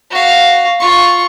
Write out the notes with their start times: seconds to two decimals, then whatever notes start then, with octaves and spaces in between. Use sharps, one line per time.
0.11 F#4 F5
0.80 F4 C#6